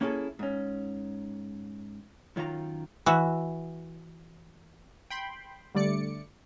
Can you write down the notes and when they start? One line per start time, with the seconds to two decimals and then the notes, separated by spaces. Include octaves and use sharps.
0.01 A#3 C#4 E4 F#4 G#4 A4
0.39 G#2 C#4
2.36 F#2 D#3 F4 F#4 A#5
3.06 E3 F#4 E5
5.10 G5 B5 C6
5.75 D3 G3 A3 D5 D6 C#7